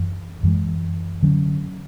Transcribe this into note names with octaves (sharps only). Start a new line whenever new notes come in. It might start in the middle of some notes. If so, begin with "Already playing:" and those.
Already playing: F#2 E3
F#2 E3 G#3
D3 F#3 C#4